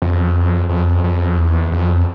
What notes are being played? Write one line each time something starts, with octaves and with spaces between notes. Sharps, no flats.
F2
F2
F2
E2
F2